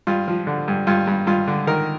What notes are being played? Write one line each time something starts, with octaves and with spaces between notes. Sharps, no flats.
G2 F4
F3
D3
G2
G2 F4
G2
G2 F4
D3
D#3 A#4